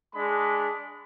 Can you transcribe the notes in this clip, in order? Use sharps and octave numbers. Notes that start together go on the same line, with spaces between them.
G#3 D4 B5